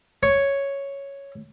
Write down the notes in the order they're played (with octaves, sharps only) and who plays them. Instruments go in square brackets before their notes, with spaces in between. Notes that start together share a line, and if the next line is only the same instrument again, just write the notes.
[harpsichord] C#5